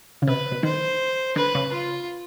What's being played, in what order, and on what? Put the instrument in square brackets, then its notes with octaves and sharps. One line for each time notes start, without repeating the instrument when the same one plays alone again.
[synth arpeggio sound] C#3
[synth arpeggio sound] C3 [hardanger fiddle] B4
[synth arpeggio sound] B2
[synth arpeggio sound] D#3 [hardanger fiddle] C5
[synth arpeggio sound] D3 [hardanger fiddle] B4
[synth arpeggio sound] C#3
[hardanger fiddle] F4